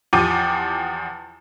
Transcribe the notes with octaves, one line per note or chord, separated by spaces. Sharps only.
E2 F3 G4 D6 D#7